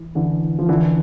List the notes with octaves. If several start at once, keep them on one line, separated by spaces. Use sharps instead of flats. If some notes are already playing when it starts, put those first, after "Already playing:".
Already playing: E3
D3 E3
F3
D3 E3